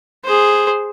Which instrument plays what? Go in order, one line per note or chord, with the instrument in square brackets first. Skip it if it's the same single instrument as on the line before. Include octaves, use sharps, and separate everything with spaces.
[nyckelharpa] G#4 C5